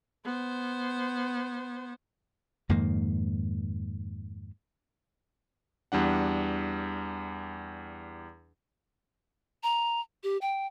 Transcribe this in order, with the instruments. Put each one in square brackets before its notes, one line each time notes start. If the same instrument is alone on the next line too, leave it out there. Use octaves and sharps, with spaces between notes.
[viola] B3 C5
[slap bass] F2 G#2 D#3 A#3
[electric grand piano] E2 G3 D4 F#5
[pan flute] A#5
G4
G5